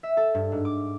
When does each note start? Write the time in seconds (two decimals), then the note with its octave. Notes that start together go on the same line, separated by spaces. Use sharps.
0.03 E5
0.17 A4
0.35 G2
0.52 G#2
0.65 D6